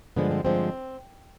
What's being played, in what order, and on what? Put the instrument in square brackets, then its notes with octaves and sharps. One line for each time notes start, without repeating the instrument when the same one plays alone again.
[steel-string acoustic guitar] G2 D3 F3 G#3 B3
C4
G2 D3 F3 G#3 C4